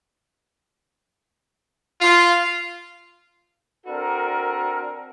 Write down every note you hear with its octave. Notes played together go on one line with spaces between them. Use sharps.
F4
C4 D4 F#4 A4 A#4